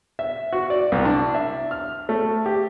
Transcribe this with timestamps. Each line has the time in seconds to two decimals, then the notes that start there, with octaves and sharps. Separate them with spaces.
0.19 E5
0.53 F#4
0.70 D5
0.92 C2
1.05 D4
1.35 E5
1.71 F6
2.09 A3
2.46 G4